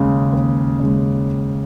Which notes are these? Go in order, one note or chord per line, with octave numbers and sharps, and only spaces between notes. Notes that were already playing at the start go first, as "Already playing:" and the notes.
Already playing: D#2 C#3 G#3
D#2
C#3 G#3